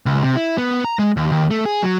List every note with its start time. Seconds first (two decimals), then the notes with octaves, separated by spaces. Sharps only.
0.06 C#2
0.23 C3
0.36 E4
0.58 B3
0.85 A#5
0.99 G#3
1.17 D#2
1.32 D#2
1.51 A3
1.66 G#4
1.82 F#3